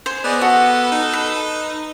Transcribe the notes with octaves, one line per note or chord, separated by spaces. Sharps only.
C5 G#5
B3 G#4 D5 D#5
F#4 A4
D#4
B4